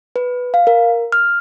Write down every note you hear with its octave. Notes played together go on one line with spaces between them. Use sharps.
B4
F5
A#4
F6